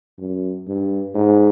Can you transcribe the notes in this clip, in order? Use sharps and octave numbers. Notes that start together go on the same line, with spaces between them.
F#2
G2
G#2